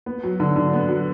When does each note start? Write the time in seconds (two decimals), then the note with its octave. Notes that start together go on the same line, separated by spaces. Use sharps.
0.06 B3
0.23 F#3
0.40 D3
0.56 D3
0.73 B3
0.89 F#3